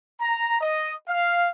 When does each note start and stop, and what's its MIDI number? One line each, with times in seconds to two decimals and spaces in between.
0.20 0.60 82
0.61 0.93 75
1.08 1.50 77